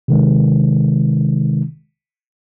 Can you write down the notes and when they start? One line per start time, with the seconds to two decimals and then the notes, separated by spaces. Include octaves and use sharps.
0.08 C3 D#3 G#3